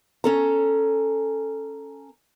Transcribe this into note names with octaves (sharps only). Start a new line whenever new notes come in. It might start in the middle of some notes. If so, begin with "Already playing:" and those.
C#4 A4 A#5